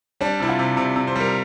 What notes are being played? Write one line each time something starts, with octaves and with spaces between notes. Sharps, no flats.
G3 D4
C3 E4
F4
C3
C3
C3
C5
G3 A#4